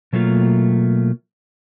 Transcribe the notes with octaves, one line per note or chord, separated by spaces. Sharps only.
B2 F#3 A3 A#3 F4